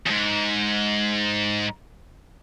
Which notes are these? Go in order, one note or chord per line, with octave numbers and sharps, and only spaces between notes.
E2 G#2